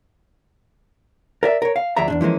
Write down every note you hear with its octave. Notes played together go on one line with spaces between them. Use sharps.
A#4 D5 E5
A#4 C#5
F5
D2 F3 G#4 D5 E5 A#5
E2 G#2 D4
E3 F3 G#3 A#3 C#4